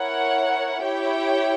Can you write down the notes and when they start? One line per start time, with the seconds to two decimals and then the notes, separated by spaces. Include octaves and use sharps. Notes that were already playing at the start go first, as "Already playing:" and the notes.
Already playing: E4 A#4 C#5 F#5
0.82 E4 G4 C#5 G5